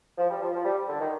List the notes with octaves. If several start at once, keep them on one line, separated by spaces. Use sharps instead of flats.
F3
G3
F3
F3
G3
D3
D#3